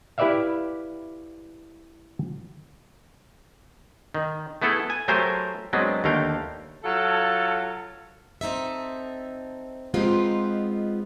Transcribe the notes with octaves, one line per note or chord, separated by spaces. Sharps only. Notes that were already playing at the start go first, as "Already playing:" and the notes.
E4 G4 B4 D5 E5 F5
D#3
A3 B3 E4 G#4 A4
G#5
F#3 A3 G4 A#4 C5 G#5
F#3 G#3 B3 C4 D4
D#2 D3 A3 F5 G5
F#3 F4 A4
C4 D#4 A4 E5
G#3 B3 C4 D#4 F4 G4